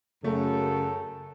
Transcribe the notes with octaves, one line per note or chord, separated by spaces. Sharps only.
F#2 C#3 A3 A4